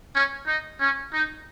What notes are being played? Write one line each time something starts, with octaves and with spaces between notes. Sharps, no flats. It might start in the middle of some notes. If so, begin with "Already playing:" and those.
C#4
D#4
C#4
D#4